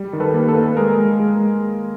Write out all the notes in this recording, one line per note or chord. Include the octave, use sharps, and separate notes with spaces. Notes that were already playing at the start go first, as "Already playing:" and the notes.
Already playing: G3
D#3
A4 B4
A#3
A4 B4
A#3
G#3 G#4 A#4
G#3
G#3